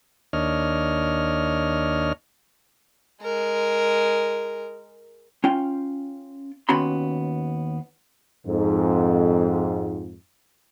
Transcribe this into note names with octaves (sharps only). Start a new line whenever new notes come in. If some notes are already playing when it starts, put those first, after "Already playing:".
D#2 D4 C#5 D#5 F6
G#3 A#4
C#4 F4 G5
D#2 B3 C#4 F#4 B5 C6
F2 G#2